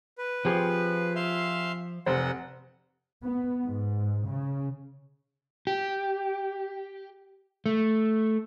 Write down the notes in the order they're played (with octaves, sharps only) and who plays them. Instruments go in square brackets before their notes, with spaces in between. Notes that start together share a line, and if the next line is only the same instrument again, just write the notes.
[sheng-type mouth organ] B4
[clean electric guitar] F3 [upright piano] C4 G4 G#4
[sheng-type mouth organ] E5 F5 C6
[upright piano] F1 C3 C5 [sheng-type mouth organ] F#5
[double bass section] B3
G#2
C#3
[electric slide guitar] G4
A3